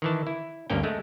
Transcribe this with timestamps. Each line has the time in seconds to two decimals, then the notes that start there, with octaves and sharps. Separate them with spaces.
0.02 D#3 E3 A5
0.27 E4
0.70 D2 G2 A#3 C#4 G5
0.83 G#3 A3